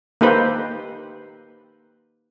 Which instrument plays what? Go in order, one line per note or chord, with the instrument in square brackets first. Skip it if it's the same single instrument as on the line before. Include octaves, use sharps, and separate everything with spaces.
[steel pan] A#3 D#4 G4 A4 B4 C5